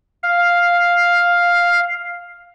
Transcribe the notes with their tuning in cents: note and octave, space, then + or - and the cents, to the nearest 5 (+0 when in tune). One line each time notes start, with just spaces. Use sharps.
F5 +5